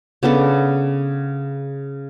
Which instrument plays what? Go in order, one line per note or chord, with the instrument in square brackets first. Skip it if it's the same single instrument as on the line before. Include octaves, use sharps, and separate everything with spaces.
[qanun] C#3 B3 D4 A4